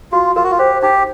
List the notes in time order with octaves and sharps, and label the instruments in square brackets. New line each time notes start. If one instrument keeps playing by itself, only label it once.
[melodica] F4 [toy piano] F#4
[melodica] F4 [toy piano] A#4
[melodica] F#4
F4
[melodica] G4 [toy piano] C5
[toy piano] D#4 [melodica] G4